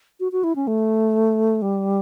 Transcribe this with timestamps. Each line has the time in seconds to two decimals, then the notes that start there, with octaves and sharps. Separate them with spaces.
0.20 F#4
0.32 F#4
0.44 E4
0.56 C#4
0.67 A3
1.62 G3